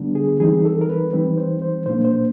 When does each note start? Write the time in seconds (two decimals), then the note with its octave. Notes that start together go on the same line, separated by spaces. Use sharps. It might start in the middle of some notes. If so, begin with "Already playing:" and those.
Already playing: D3 G3 B3 D4
0.15 G#4
0.40 E3 G3 C4 D#4 G#4
0.65 A4
0.81 A#4
0.89 B4
1.13 E3 G3 C4 D#4 B4
1.38 C5
1.62 C5
1.86 A#2 F3 A#3 D4 C5
2.05 C5